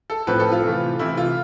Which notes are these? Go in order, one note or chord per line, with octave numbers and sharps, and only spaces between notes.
A4
A2 F3 C4 B4
A4
F4
C3 E3 A3
C3 E3 A3 E4
F4